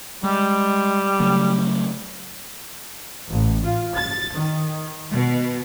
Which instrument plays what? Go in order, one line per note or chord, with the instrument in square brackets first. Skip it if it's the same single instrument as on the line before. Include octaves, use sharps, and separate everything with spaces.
[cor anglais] G3 [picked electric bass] G#3
[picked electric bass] C#3 F#3 A3
[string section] A1
F4
A6
D#3
B2